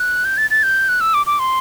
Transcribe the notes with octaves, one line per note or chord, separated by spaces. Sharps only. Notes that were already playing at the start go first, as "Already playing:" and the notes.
Already playing: F#6
G6
A6
A6
G6
F#6
E6
D6
D6
C6